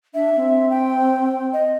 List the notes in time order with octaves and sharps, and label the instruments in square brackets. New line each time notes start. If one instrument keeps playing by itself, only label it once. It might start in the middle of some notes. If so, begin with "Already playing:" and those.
[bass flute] D4 [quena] E5
[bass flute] C4
[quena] G5
D#5